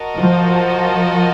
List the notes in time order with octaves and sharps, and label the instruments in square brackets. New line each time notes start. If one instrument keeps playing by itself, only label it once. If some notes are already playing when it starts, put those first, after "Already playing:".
Already playing: [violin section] F#4 A#4 D#5 A5
[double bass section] F3